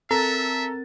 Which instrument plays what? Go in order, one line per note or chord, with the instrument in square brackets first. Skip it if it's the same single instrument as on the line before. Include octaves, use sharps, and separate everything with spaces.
[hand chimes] C4 A#4 A6 [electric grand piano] A4 A#5 [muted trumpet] E5